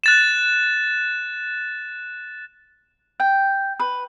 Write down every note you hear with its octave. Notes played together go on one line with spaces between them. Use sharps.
F#6 A6 E7
G5
B4